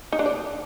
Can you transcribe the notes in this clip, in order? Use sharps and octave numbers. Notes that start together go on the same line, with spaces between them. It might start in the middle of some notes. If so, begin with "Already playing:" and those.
D#4
D4
D5